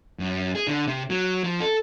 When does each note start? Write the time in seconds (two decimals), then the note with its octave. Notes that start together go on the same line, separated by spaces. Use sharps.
0.19 F#2
0.55 G#4
0.68 D3
0.87 C3
1.10 F#3
1.44 F3
1.60 A4